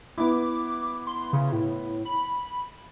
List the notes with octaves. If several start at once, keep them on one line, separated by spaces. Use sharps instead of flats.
B3 E4 D6
C6
C#3
A2
B5